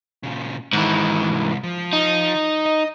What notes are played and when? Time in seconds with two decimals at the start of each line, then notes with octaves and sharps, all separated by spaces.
0.23 A#2 C#3
0.73 G#2 D#3 E3
1.30 C2
1.63 F3
1.93 D#4
2.66 D#5